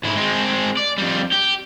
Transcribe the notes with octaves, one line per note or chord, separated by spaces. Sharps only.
G#2 E4
G#3 C4
D5
F2 G3
G4